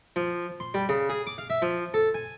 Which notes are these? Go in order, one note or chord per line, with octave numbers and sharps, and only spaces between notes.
F3
C6
G3
C#3
G#4
D6
F5
E5
F3
A4
G#5